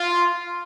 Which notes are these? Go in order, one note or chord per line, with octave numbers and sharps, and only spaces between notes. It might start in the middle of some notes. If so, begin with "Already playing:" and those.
Already playing: F4